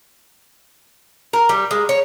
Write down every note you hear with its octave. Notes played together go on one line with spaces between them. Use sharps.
A#4
G3
G#3
C#5